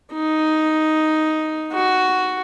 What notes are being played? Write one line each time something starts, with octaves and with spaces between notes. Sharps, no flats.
D#4
F#4